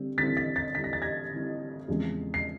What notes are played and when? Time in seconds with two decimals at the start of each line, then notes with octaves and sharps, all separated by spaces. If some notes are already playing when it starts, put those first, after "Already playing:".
Already playing: D3 G3 C4
0.18 D3 G3 C4 E4 A6 B6
0.37 A6 B6
0.56 A6 B6
0.75 D3 G3 C4 E4 B6
0.84 A#6
0.93 A6
1.02 G#6 A#6
1.31 D3 G3 C4 E4
1.88 E2 C#3 F3 G#3 C4
2.34 C7